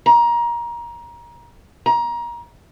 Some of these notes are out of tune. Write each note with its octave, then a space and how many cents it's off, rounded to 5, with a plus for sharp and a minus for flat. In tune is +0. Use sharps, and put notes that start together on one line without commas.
A#5 +25
A#5 +25